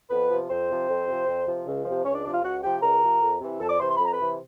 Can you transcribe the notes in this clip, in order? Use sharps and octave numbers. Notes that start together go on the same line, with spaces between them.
F2 B3 B4
C3 F3
F2 C4 C5
C3 F3
F2
C3 F3
F2
C3 F3
C#2
C3 F3
C#2 C#4 C#5
D4 D5
C3 F3 D4 D5
F4 F5
C#2 F#4 F#5
C3 F3 G4 G5
C#2 A#4 A#5
C3 F3
F2
C3 E3
F2 A4 A5
D5 D6
C3 E3 C5 C6
C6
F2 B5
A#5
B4 B5
C3 E3